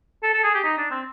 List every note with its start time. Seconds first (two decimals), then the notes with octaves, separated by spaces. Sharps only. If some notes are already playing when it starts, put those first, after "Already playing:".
0.23 A4
0.34 A4
0.44 G#4
0.55 G4
0.64 D#4
0.78 D4
0.91 C4